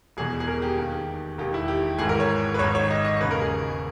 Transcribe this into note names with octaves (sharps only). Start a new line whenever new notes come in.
E1 E2 B2 G#4
G#4
A#4
G4
D#2 D#3
E1 D#2 D#3 G4
E4
G4
G#1 G#2 E3 G#4
A#4
C#5
B4
G#1 G#2 D#3 C#5
C#5
D#5
D#5
E1 D#2 C#3 B4
A#4
G#4